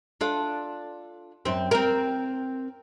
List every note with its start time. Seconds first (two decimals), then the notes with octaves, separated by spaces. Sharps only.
0.21 D4 F4 A4
1.45 F#2 C4
1.71 C4 A#4